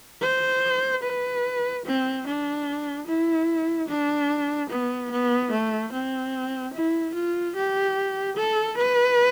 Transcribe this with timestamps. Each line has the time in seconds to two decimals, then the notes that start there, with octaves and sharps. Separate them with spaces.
0.22 C5
1.03 B4
1.85 C4
2.26 D4
3.08 E4
3.88 D4
4.70 B3
5.12 B3
5.51 A3
5.92 C4
6.74 E4
7.14 F4
7.56 G4
8.37 A4
8.77 B4